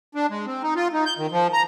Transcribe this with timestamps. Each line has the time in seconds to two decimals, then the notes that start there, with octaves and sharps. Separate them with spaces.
0.15 D4
0.30 G#3
0.46 C4
0.63 D#4
0.76 F4
0.93 D#4
1.06 G6
1.18 D#3
1.31 F3
1.53 A#5